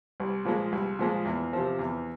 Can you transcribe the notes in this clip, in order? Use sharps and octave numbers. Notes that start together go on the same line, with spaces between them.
C2
A#2 F3 G#3
C2
A#2 F3 G#3
E2
C3 F3
E2